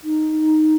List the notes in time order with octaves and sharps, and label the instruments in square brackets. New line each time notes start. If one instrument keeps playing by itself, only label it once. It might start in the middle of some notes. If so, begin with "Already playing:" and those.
[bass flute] D#4